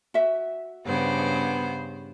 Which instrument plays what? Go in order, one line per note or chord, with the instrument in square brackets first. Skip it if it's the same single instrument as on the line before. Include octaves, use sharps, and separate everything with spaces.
[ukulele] F#4 E5
[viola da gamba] G2 C#3 C5 [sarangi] B3